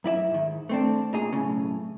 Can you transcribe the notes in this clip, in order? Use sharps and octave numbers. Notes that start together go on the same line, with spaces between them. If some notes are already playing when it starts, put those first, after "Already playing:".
F#2 E4 D5 E5
G#2 D#3
A3 C4 D4
A#2 D#4 G#4
B1 E2 A2 C#3